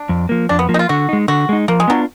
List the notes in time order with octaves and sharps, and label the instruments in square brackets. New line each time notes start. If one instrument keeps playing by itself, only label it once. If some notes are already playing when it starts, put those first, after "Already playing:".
Already playing: [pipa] D4
[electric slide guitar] F2
F3 A#3
[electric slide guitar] F2 [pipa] D4
[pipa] B3
[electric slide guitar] F3 A#3
[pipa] D#4
F4
[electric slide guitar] D3 [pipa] F#4
[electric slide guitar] G#3 D#4
[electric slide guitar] D3 [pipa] F#4
[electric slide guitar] G#3 D#4
[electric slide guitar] F3 [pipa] A#3
[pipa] G#3
[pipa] F#3 [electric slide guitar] B3 D4 F4